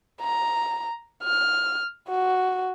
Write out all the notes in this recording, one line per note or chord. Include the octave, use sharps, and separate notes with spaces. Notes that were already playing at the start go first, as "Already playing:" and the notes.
A#5
F6
F#4